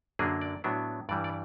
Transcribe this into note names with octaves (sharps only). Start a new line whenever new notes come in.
F#2 D3 F#3 A#3 D4 G#4
D5
A2 F#3 B3 D4
G2 E3 G3 D5
D5